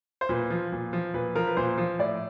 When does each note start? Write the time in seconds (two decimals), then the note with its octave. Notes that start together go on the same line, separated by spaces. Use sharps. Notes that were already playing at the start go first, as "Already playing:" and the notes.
0.21 C5
0.29 A#2 B4
0.50 F3
0.72 A#2
0.93 F3
1.14 A#2 B4
1.35 F3 A#4
1.47 B4
1.57 A#2 C5
1.78 F3
1.99 A2 D5